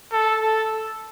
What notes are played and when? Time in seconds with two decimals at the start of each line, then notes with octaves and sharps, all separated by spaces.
0.13 A4
0.42 A4